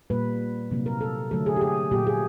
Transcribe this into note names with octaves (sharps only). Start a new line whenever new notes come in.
A#2 G3 A#3 B4
C3 D#3 F#3 A#3
A#4
A4
D3 F#3 A3 A4
G#4
G4
G#4
A#2 F#3 A#3 G4
G#4